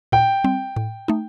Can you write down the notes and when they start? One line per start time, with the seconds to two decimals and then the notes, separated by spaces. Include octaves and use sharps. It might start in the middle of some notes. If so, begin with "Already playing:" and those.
0.12 A#2 G5
0.44 G3 C4
0.76 A2
1.08 A3 D#4